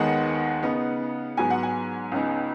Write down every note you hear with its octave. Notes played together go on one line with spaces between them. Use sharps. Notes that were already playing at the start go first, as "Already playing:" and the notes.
Already playing: D#2 D#3 G#3 B3 D#4 F#5
C#3 B3 D#4
G#2 F#3 B3 G#5
F#5
G#5
C#2 C#3 B3 D#4